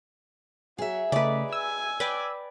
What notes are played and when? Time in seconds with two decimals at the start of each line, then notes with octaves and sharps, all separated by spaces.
0.78 F#3 G#4 E5
1.12 C#3 A3 D#4 B4 D5
1.53 G#5 E6
2.00 B4 D5 G5